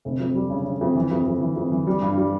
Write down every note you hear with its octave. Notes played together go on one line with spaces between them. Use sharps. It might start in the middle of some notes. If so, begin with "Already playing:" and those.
F1
F2
G3
C#3
C#3
F2
E3
F2
F2
E3
F2
E3
G3
G2
G3